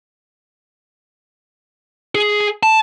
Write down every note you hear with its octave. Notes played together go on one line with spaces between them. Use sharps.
G#4
A5